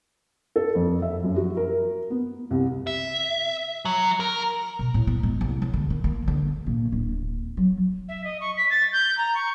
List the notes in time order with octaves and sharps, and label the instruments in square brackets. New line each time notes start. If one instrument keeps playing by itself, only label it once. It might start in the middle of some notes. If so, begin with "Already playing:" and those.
[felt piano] A4
F2
E5
F#2
F#4
A#4
B3
C2
[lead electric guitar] E5
F#3
A#4
[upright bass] B2
A2
B3
G#3
C2
F#3
D3
D#3
A#3
D3
A#2
D1
F#3
[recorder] E5
D#5
C#6
B6
A6
G6
A#5
C#6